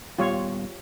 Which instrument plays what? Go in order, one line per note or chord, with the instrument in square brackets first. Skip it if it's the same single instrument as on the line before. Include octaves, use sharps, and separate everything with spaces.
[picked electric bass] D#1 G3 B3 [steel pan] F4 G4 C#5